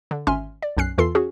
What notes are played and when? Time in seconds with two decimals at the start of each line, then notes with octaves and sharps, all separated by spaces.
0.11 D3
0.27 G#1 C#4 E5 G#5 C6 F6
0.62 D5
0.77 B1 F#2 C#4 F#6 C7
0.98 E2 E3 F4 A4 C6 C7
1.15 C#4 F#4 G#4